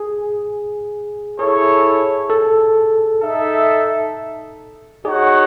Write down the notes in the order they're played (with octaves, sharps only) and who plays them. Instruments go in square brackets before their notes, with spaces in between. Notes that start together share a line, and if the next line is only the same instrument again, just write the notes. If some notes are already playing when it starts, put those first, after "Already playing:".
Already playing: [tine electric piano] G#4
[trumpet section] E4 A4 C#5 [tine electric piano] G#4
[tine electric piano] A4
[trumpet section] D#4 A4 E5
[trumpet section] D#4 F#4 C#5 F#5 [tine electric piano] G#4